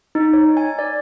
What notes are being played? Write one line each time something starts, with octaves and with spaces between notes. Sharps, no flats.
D#4
C#5
G#5
D5